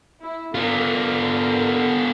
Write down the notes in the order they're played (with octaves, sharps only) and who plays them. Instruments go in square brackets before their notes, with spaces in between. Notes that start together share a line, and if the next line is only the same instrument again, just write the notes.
[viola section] E4
[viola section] D3 A#4 [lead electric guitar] B3 F4